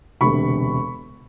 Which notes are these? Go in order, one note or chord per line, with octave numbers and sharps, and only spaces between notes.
E1 D2 C3 B5 C#6